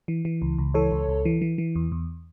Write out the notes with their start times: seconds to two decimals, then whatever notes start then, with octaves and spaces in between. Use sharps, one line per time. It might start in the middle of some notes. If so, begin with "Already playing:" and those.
0.08 E3
0.25 E3
0.42 C#2
0.58 C#2
0.74 E3 A4 C#5
0.92 C#2
1.08 C#2
1.25 E3
1.42 E3
1.58 E3
1.76 E2
1.92 E2